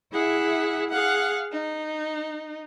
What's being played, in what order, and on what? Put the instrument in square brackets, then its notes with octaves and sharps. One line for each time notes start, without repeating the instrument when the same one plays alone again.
[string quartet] E4 G#4 E5 F#5
G#4 F5 F#5
D#4